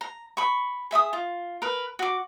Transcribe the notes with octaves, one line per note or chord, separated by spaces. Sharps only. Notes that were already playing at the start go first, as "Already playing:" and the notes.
A#5
B5 C#6
G#4 E5 C#6 D#6
F4
A#4 B4
F#4 D6